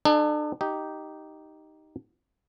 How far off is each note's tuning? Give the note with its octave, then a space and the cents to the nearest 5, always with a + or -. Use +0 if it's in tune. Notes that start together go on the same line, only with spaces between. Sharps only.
D4 +40 A4 -35
D#4 +0 G4 -10